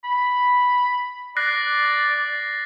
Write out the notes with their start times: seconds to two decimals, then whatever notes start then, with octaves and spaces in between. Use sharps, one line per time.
0.04 B5
1.37 D5 F#6 A#6 C7
1.85 A6